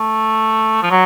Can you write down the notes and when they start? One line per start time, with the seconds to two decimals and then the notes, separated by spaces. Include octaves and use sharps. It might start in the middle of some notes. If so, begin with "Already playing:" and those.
Already playing: A3
0.83 F3
0.91 F#3